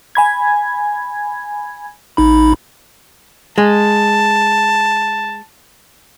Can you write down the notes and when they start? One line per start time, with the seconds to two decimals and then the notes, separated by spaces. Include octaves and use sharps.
0.15 G#5 B5 G#6
2.17 A1 D#4 B5
3.58 G#3 A5